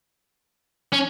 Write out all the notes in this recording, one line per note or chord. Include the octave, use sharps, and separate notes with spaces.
C#4